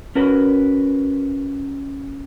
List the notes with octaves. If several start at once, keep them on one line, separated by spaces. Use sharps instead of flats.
C#4 F#4 A#4 B4